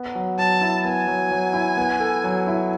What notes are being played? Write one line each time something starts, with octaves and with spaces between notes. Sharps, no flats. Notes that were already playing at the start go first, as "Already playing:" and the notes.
Already playing: B3
F#3
F#3 A5
E4
B3 G#5
F#3
F#3
E4
B3
A4
F#3
E4